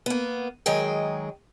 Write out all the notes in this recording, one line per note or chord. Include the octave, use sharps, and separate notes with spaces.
A#3 B3
D#3 F#3 G#3 G#4 G5